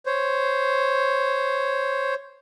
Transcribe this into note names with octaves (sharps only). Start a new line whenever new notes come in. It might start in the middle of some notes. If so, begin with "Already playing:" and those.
C5 C#5